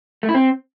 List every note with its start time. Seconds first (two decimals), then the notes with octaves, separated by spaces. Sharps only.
0.23 A3
0.29 E4
0.34 C4